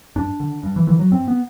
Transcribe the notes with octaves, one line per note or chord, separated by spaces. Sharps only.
G2 D4
D3
G2
E3
D3 E3
F#3
G2 C4
B3